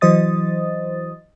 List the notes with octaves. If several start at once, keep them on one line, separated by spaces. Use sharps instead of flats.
E3 F#3 C5 D#5 D#6 A6